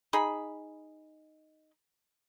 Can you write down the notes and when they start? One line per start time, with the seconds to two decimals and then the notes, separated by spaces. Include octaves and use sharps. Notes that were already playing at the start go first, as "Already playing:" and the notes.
0.13 D#4 G#4 B5